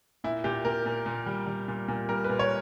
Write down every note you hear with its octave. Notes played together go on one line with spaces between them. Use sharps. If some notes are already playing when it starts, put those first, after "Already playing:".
A#2 E4
A#2 G4
A#2 A#4
A#2
A#2
G3
G3
A#2
A#2
G3 A#4
B4
A#2
C#5